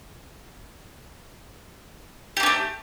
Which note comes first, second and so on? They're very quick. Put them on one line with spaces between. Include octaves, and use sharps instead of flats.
G4 A#3 C#4 A3